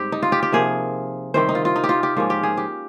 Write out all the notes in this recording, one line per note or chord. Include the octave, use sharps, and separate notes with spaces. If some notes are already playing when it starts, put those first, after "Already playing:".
Already playing: G#2 G3 C4 G4
D#4
F4
G4
G4
C3 F3 A#3 G#4
C3 D#3 G3 C4 C5
D#4
F4
F4
D#4
G4
F4
G4
G#2 F3 A#3 C#4 F4
G4
G#4
G4